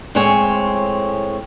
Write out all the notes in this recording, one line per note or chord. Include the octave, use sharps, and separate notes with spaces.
A2 G#3 C4 C#5 G#5